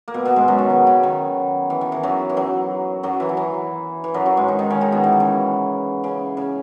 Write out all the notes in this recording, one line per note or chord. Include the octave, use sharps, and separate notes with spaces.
A#3
B2 B3
B2 B3
G#2 G#3
F#2 F#3
D#3
B2
C#3
D#3
E3
D#3
E3
F#2 F#3
E3
F#2 F#3
F#2 F#3
E3
F#3
E3
E3
F#2 F#3
F#2 F#3
G#2 G#3
D#3 D#4
D#3 D#4
C#3 C#4
D#3 D#4
B2 B3
E3
D#3
C#3
C#3
C#3